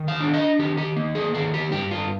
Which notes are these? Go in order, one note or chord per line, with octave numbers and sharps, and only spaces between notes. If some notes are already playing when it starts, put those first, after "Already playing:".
Already playing: D#3
F5
D4
D#5
D#3 G4
G4
A#3
G#4
D#3 G#4
G4
G2 G4
F4